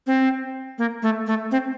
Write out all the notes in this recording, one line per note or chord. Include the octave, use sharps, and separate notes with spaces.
C4
A#3
A3
A3
C4